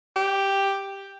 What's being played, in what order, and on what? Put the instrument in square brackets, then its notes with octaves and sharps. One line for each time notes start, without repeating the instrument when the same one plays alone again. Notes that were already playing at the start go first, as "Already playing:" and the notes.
[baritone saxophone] G4